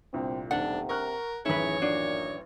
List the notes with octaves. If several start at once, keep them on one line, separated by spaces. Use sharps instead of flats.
G1 C2 A#2 C4
D#1 B1 C3 D4 F#5
A#4 C#6 F6 F#6
A1 F#2 D#3 E4 G#4 B4 C#5
A#2 D4 F#4 D5